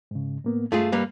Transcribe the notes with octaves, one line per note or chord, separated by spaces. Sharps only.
G#2 C#3
A2 A#3 B3
G2 A3 F4 G#4
G3 A#3 B4